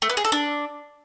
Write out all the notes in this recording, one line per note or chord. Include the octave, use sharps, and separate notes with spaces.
A3
B3
G#4
A4
D4